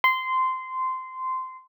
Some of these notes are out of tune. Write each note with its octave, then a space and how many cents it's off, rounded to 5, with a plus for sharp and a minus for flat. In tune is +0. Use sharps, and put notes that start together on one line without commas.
C6 -15